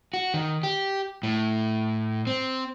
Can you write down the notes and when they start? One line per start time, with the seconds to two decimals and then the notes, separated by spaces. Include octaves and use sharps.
0.14 F#4
0.34 D#3
0.63 G4
1.23 A2
2.27 C4